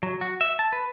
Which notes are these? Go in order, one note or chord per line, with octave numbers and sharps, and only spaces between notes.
F#3
F#4
E5
A5
B4